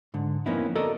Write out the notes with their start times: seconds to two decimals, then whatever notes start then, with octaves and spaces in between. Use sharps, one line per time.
0.14 G#2 D3
0.46 F2 A#3 B3 C#4 D#4 E4
0.75 F#4 A4 A#4 D5 D#5